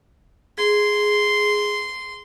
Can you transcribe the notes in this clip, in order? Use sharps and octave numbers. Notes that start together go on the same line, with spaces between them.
G#4 C6